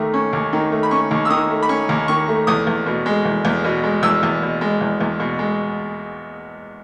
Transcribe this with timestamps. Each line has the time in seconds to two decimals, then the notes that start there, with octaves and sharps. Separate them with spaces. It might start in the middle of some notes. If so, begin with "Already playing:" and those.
Already playing: D#2 D#3 A3
0.14 C#4
0.33 D#2
0.53 D#3
0.72 A3
0.83 B5
0.91 C#4 C#6
1.11 D#2
1.25 E6
1.30 D#3 D#6
1.50 A3
1.62 B5
1.69 C#4 C#6
1.89 D#2
2.08 D#3 C#6
2.28 A3
2.47 E2 D#6
2.67 E2
2.86 B2
3.06 G#3
3.25 E2
3.45 E2
3.64 B2
3.84 G#3
4.03 E2 E6
4.23 E2
4.42 B2
4.61 G#3
4.81 E2
5.01 E2
5.20 B2
5.39 G#3